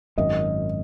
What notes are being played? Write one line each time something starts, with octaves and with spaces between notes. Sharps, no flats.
G#1 F#2 D#3 D#5